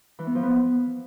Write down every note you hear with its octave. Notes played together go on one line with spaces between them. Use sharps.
E3
B3
F3
B3